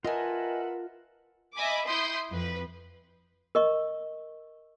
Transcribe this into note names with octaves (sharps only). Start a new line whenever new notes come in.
F4 A#4 B4 D#5 E5 F#5 G#5 A5
D#5 E5 G#5 B5 D6
E4 C6 D#6 G6
F2 B4
A#4 D#5 C#6